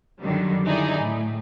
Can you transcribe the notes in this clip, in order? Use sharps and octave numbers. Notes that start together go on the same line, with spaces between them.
F#2 D3 D#3 F#3 G3
D3 D#3 D#4 E4 G#4 D5
A2